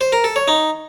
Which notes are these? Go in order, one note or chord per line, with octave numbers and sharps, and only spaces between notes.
C5
A#4
A4
C#5
D#4